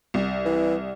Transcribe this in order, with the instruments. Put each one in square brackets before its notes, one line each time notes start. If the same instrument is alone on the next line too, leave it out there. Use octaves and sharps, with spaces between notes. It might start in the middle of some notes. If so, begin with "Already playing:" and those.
[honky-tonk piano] C2
[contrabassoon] E3